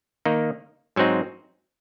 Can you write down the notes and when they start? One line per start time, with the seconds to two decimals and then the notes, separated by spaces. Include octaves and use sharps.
0.25 D#3 A#3 D#4
0.96 G#2 F#3 C4 D#4